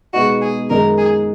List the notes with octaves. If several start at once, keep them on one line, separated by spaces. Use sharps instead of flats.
B2 G#3 B3 D#4 F#4
G#4
F#2 D#3 G#3 D#4 A#4
G#4